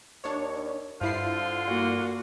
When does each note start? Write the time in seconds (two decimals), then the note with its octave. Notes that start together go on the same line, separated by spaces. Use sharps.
0.24 D#2 D4 C#5
1.01 G2 D3 F3 E4 F4 C6 C7
1.67 A#2 A#3 F#4